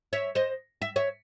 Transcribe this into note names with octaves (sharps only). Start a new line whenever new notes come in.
C#5 E5
C5 D#5
E5
C#5 E5